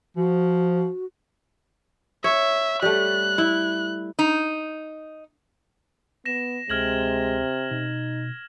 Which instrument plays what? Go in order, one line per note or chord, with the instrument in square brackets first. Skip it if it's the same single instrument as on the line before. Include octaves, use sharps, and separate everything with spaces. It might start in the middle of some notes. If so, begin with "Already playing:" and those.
[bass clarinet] F3 [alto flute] F#4
[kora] C#5 [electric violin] E5
[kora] G3 A3 [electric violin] F#6
[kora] E4
[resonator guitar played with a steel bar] D#4
[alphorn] B3 [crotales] A#6 E7
[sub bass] D2 [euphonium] C3 [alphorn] G#3 [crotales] F6 G#6 F#7
[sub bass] B2 [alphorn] D#4